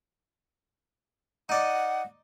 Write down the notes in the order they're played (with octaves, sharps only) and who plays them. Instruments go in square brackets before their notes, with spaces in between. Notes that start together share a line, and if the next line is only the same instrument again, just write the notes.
[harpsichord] D#4 D5 D#5 [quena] F#5